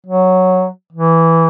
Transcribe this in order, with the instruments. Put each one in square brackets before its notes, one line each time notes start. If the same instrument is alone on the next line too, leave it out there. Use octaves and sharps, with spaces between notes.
[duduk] F#3
E3